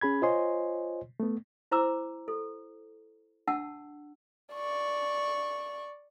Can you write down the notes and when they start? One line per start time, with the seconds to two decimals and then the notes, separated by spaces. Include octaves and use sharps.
0.01 C#4 G#4 B5 G#6
0.22 F4 C5 C#5 D#5 G#5 C6
1.20 A3 B3
1.71 E4 C5 A#5 D6 E6
2.28 A4
3.47 D4 F#5 A5 E6
4.54 D5 C#6